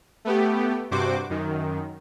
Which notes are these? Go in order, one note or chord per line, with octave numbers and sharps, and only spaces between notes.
A3 B3 G4
G2 C3 F#4 C5 D6
F#2 D#3